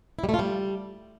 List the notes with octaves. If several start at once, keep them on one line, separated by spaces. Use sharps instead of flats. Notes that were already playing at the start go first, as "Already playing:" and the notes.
E4
G3
A3
F4
G3